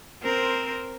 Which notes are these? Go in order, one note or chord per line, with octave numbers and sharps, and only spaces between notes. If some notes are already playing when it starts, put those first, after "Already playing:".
C4 A#4 C5